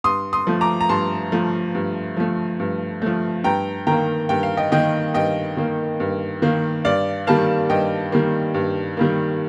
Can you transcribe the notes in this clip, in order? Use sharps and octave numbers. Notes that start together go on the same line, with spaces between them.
G2 C6 D#6
C6 D#6
F3 A3
A#5 D6
A#5
G2 A5 C6
F3 A3
G2
F3 A3
G2
F3 A3
G2 G5 A#5
D#3 A#3 G5 A#5
G2 G5
F5
D#5 G5
D#3 A#3 D#5 G5
G2 D#5 G5
D#3 A#3
G2
D#3 A#3
G2 D5 F5
D#3 G3 A#3 F5 A5
G2 D#5 G5
D#3 G3 A#3
G2
D#3 G3 A#3